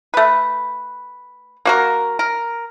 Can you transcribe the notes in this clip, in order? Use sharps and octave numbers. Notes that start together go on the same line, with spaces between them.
A3 B4
A#3 F#4 A#4
A#4